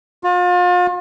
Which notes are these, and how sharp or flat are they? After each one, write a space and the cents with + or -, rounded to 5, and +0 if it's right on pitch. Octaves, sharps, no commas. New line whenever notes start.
F4 +40